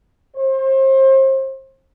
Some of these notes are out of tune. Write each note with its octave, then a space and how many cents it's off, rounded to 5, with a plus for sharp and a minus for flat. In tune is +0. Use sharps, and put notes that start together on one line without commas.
C5 +35